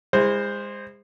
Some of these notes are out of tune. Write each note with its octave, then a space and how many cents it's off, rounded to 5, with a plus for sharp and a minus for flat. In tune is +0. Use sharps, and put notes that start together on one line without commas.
G#3 -30 E4 +0 C5 +0